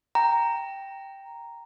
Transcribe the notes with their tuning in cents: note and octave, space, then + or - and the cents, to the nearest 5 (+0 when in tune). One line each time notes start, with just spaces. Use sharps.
G5 +0 A#5 +0